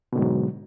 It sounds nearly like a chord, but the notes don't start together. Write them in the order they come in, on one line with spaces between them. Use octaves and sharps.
B2 D3 G#2 F#3